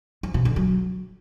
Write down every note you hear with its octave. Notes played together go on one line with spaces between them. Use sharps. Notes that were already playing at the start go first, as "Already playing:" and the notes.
F3
B2
D3
F#3